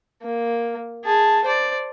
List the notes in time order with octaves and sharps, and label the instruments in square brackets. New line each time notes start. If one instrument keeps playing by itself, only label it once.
[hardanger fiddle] A#3
G#4 A5
C5 D5